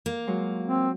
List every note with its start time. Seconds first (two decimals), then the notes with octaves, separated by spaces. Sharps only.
0.06 A#3
0.27 F#3 G#3 F4
0.65 C4